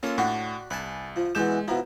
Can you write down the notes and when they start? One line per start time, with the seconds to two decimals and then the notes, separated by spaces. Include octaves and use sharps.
0.03 A#3 C#4 F4 A4 C6
0.18 A2 D4 F#4 G4
0.70 C2 B4 G#5 A5
1.16 F3
1.35 B2 E3 G#3 D6 G6 E7
1.68 B2 F3 E4 A#5